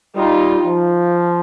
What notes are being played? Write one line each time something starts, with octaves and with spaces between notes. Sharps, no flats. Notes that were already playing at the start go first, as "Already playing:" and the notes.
G3 D#4 F4
F3